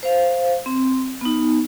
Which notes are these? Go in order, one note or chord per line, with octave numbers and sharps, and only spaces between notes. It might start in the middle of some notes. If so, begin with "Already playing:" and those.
C5 F5
C4
B3 D#4